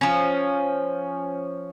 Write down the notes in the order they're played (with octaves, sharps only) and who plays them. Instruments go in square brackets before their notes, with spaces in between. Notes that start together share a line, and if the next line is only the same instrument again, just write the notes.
[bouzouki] F3 C#4